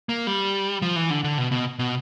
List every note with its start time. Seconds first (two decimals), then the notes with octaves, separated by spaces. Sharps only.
0.09 A#3
0.27 G3
0.82 F3
0.96 E3
1.10 D3
1.24 D3
1.38 B2
1.52 B2
1.79 B2